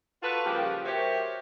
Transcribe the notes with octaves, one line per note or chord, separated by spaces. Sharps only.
F4 F#4 A4 B4
C#3 F3 G3 A#3 G4
F#4 G4 A#4 C5 C#5 E5